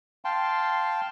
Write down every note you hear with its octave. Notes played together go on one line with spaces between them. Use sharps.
F5 G5 A5 C6